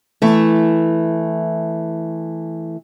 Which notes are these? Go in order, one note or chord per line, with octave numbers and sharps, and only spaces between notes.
E3 A3